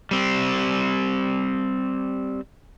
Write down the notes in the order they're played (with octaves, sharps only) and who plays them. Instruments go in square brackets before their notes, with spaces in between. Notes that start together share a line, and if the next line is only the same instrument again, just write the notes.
[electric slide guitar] G3 C4